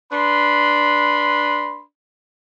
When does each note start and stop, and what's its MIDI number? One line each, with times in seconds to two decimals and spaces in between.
0.12 1.81 62
0.12 1.81 71
0.12 1.81 83
0.12 1.81 84